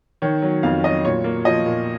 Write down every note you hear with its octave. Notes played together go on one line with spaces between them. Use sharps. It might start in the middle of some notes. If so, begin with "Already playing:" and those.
D#3 C#5
F#3
F2 F5
F#3 D#5
A#2 C#5
A#3
F3 D#5
A#2